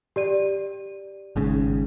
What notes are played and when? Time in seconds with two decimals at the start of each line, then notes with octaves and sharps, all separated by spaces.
0.16 G4 D5 D#7
1.36 G#1 G#2 C#3